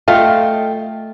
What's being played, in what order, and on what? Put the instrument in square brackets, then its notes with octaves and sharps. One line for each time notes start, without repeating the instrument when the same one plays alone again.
[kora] A3 F4 [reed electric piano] A4 D#5 G5